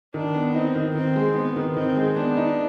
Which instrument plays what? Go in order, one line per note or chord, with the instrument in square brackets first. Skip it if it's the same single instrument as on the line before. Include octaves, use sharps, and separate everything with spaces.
[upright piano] D#3 [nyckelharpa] D4
[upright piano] B3
[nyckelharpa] C4 [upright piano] D#4
[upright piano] D#3
[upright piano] D#3 [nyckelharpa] C4
[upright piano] G#3
[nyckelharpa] B3 [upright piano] C4
[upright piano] D#3
[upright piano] D#3 [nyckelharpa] C4
[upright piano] G#3
[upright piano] B3 [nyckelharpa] D4
[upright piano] D#4